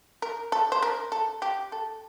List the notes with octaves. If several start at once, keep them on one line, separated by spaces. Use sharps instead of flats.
A#4
A4
C5
A#4
A4
G4
A4